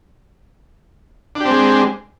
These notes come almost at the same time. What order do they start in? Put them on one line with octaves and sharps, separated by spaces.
D4 G4 C4 G#3